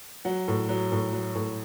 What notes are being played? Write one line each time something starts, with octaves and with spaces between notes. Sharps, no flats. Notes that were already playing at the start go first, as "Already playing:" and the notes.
F#3 F#5
A2
F#3
A2
F#3
A2